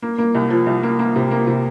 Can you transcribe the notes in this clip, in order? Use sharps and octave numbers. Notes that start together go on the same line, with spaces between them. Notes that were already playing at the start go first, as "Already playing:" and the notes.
A#3
A#3
C2
F3
C2
A#3
A#3
C3
A#3
C3